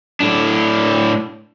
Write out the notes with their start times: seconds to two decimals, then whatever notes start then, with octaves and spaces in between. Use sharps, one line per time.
0.20 A2 D4